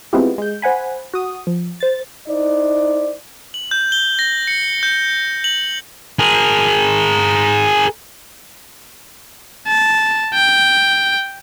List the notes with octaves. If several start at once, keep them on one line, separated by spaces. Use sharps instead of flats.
G#3 B3 C4 E4 F4 G4
G#3 G6
C5 F#5 G#5 B5
F#4 D#6
F3
C5 A6
D#4 E4 C5 D5
F#7
G6
G7
A#6
C#7
G6
F#7
G#4 A#4
A5
G5